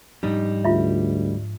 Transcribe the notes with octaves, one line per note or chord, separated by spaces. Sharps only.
G#2 F3 G3 D4 D#4
D2 F4 E5